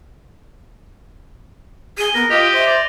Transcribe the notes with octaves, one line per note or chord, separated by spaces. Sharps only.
G#4 D#7 G7
B3 A#4 A#6
F4 G4 D#5 F7
C5 E5
D5